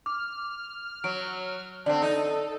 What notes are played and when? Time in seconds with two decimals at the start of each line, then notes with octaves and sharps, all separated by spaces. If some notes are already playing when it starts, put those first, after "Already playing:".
0.06 D6 F6
1.04 F#3 D7
1.86 D3 C4 D5
2.02 D#4 A4